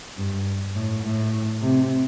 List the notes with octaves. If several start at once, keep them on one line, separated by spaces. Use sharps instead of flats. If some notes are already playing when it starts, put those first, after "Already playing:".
G2
A2
A2
C3